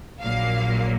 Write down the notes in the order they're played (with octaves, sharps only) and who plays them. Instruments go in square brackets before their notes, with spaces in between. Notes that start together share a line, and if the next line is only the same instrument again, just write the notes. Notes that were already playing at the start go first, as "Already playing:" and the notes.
[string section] A#1 A#2 F#3 A#3 F5